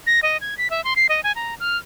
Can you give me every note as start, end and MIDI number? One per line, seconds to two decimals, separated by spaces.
0.07 0.20 94
0.23 0.37 75
0.41 0.57 92
0.58 0.70 95
0.70 0.84 76
0.84 0.94 84
0.96 1.07 96
1.09 1.21 75
1.24 1.32 80
1.36 1.55 82
1.60 1.77 89